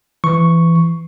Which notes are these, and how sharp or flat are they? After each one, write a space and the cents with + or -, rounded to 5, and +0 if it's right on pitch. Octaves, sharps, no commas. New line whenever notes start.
E3 +20 C#6 +0